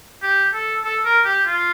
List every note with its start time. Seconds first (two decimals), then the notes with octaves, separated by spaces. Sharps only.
0.23 G4
0.54 A4
0.84 A4
1.05 A#4
1.25 G4
1.46 F4